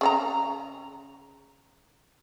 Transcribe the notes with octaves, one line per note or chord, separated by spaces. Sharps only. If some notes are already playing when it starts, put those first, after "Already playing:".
C#3 D#4 A#5